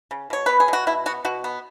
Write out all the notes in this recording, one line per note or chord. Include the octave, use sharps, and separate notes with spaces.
C#3
B2 C#5
B3 B4
G#4
B2 F#4
B2 E4
B3 F#4
B2 F#4
B3